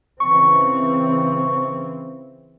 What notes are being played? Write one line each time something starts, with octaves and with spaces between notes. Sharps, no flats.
C#3 E3 C4 C#6